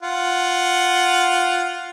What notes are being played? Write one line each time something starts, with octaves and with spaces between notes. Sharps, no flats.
F4 F#5